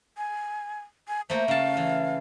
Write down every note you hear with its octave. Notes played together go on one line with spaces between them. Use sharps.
G#5
G#5
A3 A#3 C5
C#3 F5 A5
E3